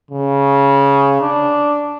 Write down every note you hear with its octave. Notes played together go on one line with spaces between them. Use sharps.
C#3
D4